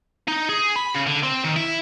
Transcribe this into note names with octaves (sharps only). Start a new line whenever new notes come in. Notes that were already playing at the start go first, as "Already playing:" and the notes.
D#4
G#4
B5
C#3
D3
C4
D#3
E4